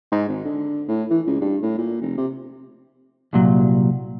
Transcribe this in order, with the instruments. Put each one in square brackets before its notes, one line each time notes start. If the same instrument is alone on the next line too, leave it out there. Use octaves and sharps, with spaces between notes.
[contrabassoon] G#2
G#1
D3
A2
E3
C#2
G2
A2
A#2
F1
C3
[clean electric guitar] C2 A#2 F#3